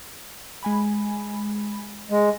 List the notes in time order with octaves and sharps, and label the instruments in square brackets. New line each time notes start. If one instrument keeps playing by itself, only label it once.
[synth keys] G#3 G#5 B5
[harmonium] G#3